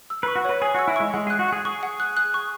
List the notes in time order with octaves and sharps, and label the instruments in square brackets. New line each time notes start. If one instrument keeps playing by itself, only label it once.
[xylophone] E6
[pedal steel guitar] B4 [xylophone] C#6
[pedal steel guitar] F#4
[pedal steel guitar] B4 [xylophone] C#5
[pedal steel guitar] G#4 [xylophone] G#5
[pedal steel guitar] F#4 [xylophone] E6
[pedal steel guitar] E4
[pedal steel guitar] G#3 [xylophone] C#6
[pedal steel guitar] G#3 [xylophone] F#5
[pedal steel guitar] G#4 [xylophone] F#6
[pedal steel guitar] F#4
[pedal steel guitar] G#4 [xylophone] F#5
[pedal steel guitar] G#4 [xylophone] C#6
[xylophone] F#5
F#6
F#6
C#6